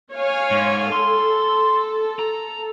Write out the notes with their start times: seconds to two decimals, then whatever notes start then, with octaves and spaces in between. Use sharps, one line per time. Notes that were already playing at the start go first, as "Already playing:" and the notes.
0.12 C#5 F5 G#5
0.51 G#2
0.92 A4 C6
2.19 A#5